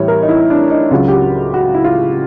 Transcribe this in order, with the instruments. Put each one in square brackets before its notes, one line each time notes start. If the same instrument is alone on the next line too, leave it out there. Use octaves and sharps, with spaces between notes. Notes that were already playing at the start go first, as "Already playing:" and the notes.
Already playing: [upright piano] A2 E3 G3 C#5
A#4
D#4
E4
D4
D#4
C#2 C#3 F#3 F4
G4
F#4
F#4
E4
F4